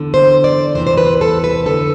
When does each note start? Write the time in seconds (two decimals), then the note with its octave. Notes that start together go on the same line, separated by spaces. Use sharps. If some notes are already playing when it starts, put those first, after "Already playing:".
Already playing: E2 D3
0.14 C5
0.44 D5
0.75 E2 C3 E3 C5
0.87 C5
0.97 B4
1.21 A4
1.44 B4
1.66 F2 D3 A4